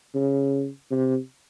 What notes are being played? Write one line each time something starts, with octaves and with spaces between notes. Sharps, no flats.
C#3
C3